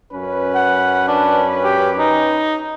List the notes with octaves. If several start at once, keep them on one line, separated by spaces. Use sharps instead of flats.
F#2 C#4 B4
F#5
D4
G4
D#4